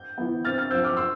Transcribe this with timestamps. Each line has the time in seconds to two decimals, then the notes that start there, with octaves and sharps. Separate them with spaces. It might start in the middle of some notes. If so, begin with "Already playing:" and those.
Already playing: G6
0.18 E3 B3
0.45 C3 F6 A6
0.58 F6 A6
0.70 F3 C4 E6 G6
0.84 D6 F6
0.97 C6 E6